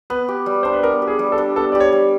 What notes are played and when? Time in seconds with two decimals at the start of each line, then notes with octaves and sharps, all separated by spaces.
0.10 B3 B4
0.28 G4
0.46 G3
0.63 D4 C5
0.73 B4
0.83 B3 A#4
1.02 G4
1.07 G#4
1.19 G3
1.32 A4
1.38 D4
1.56 B3 A4
1.72 G4 D5
1.80 C#5
1.92 G3